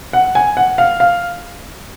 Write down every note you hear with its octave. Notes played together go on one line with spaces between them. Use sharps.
F#5
G#5
F#5
F5
F5